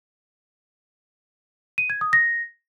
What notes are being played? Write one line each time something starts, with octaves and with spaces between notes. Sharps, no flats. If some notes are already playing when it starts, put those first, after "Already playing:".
D#7
G#6
D#6
A#6